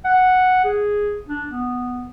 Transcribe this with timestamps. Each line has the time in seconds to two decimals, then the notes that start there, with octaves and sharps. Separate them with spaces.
0.05 F#5
0.64 G#4
1.28 D4
1.49 B3